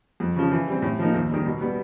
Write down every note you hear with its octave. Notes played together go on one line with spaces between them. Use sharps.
F2
C#3 F3
E3
G3 C4
A2
F3 A#3 D#4
D#2
D#3 G3
B2
G3 B3